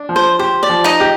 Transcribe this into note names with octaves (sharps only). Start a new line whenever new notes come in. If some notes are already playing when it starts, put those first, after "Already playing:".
Already playing: D4
F3
C5
G4 C5
D5
F3
D#4 D#5
G4